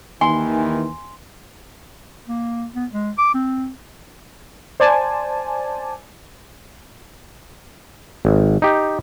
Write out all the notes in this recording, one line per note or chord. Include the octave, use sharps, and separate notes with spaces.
D#2 D#3 E3 G#5 C6
A#3
B3
G#3
D6
C4
C5 D5 G#5 A5
G#1
D#4 G4